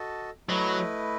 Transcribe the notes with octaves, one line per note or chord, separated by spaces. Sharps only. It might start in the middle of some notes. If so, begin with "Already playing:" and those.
Already playing: F#4 A4 D#5 A5
F#3 A3 E4 B4 D#5